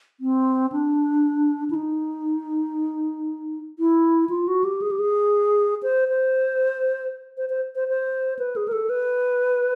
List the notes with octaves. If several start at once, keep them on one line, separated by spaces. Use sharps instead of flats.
C4
D4
E4
D#4
E4
F4
F#4
G4
G#4
G4
G#4
C5
C5
C5
C5
C5
C5
B4
G#4
A#4
A4
B4